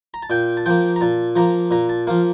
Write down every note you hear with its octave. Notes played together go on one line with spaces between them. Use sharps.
A#5
A5
A#2 G5
A5
F3 A#3 G5
A#5
A#2 A5
F3 A#3 A#5
A#2 A#5
A5
F3 A#3 F5